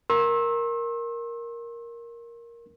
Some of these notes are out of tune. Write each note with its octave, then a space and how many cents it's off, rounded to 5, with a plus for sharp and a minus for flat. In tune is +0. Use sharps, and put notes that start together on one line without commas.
A#4 +5 C6 +45 E6 -10